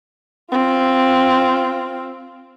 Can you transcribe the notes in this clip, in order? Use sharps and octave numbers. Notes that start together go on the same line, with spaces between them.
C4 F4